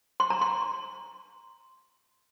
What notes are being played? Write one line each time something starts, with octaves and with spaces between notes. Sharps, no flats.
C6
A#5
C6